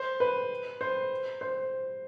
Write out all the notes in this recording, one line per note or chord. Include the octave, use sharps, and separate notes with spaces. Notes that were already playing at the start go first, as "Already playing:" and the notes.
Already playing: C5
B4
C5
C5